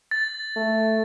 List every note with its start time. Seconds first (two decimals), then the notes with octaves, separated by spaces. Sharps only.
0.11 A6
0.56 A3